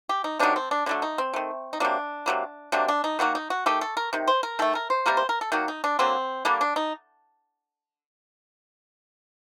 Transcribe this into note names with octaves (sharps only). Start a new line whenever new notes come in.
G4
D#4
C3 D#3 F#3 D4
C4
D4
D3 F#3 A3 D4
D#4
C4
D#3 A3
D#4
C3 F#3 A#3 D4
C3 D#3 F#3 A#3
C3 F#3 A#3 D4
D4
D#4
D#3 F#3 A#3 F#4
D#4
F#4
D#3 A3 G4
A4
A#4
C3 D#3
C5
A#4
D#3 A3 A4
A#4
C5
C3 G3 A#3 A#4
C5
A#4
A4
D#3 F#3 A#3 F#4
D#4
D4
D3 F#3 A#3 C4
D3 G3 A#3 D4
D4
D#4